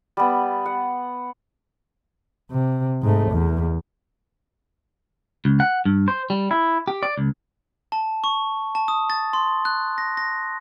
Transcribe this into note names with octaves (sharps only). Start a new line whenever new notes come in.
G3 B3
F#5
C3
G#2 A3
E2
C#2
F#5
G2
C5
G3
E4
G4
D5
C#2
A5
C#6
A5
D#6
A6
C6
F#6
A#6
A#6